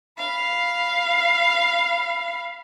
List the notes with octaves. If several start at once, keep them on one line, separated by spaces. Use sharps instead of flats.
F5 B5